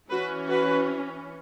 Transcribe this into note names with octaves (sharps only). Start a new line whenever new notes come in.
E3 C#4 F#4 B4
F#4 B4